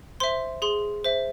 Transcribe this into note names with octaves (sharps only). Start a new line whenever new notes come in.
C5 E5 C6
G#4 C6
C5 E5